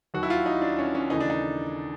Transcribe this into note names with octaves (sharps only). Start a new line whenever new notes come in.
D#2 D#3 F#3 F#4
E4
F4
D#4
D4
C#4
C#4
D#2 C#3 E3 A3 D#4
D4
D#4